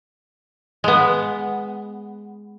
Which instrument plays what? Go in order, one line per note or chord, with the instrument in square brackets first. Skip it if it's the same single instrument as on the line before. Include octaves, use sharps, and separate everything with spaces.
[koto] G#3 B3